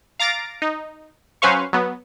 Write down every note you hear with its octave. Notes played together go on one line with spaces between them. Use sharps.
F5 A#5 D6 A6 A#6 D7
D#4
F#3 C#4 B4 C5 F5 C#6
F#3 B3